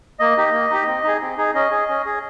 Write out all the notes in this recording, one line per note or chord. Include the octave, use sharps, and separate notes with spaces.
A#3 D#5
D#4 G4
A#3
D#4 G4
C4
D#4 G#4
C4
D#4 G#4
C#4 D#5
G#4
C#4
G#4